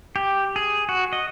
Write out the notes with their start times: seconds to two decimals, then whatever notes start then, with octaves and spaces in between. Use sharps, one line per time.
0.16 G4
0.56 G#4
0.89 F#4
1.13 D#5